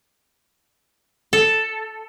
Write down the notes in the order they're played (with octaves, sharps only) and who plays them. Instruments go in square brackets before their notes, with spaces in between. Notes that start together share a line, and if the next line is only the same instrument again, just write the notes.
[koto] A4